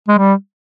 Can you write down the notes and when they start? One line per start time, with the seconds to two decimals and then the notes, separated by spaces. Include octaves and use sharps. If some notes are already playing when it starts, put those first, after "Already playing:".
0.08 G#3
0.18 G3